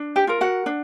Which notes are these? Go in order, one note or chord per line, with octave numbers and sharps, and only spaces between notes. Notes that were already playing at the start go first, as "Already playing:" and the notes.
Already playing: D4
G4 G5
F4 A#4
F#4 F#5
D4